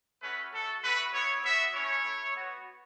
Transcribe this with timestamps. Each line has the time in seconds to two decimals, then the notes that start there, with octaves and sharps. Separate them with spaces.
0.21 A3 C#4 F#4 B4
0.53 A3 F#4 A4
0.83 A3 F#4 B4
1.13 B3 E4 C#5
1.43 B3 F#4 E5
1.74 A3 C#4 E4 C#5
2.04 A3 E4
2.35 B3 F#4